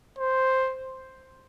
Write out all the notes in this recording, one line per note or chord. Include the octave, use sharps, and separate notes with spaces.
C5